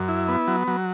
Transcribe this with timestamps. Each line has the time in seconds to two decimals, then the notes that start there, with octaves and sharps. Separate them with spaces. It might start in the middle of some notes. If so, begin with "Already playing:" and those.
Already playing: F#2
0.08 E4
0.28 B3
0.48 F#3
0.67 F#3